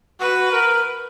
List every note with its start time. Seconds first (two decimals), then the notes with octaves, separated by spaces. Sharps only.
0.20 F#4 B4
0.52 A#4